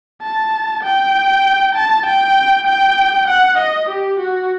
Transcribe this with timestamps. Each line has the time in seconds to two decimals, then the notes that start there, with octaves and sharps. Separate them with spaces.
0.22 A5
0.83 G5
1.75 A5
2.05 G5
2.67 G5
3.27 F#5
3.58 D#5
3.89 G4
4.19 F#4